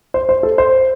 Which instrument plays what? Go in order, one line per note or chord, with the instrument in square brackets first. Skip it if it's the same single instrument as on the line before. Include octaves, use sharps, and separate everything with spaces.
[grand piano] C5
C5
A4
C5